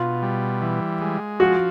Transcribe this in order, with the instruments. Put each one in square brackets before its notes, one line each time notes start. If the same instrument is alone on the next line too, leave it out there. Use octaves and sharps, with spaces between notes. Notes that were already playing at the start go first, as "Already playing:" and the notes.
Already playing: [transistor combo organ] B2 [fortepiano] F4
[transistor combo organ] G3
E3
G#3
[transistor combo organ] F3 [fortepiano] F#4